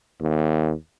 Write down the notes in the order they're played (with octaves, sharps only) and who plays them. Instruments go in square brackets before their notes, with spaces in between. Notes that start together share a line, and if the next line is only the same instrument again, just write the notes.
[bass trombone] D#2